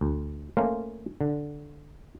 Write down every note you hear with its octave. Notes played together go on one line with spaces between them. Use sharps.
D2
A3 A#3 C#4 A#4 C5 F5
D3